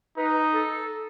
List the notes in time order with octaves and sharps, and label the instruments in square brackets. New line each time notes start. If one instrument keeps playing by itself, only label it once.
[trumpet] D#4 [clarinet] B4
[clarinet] A4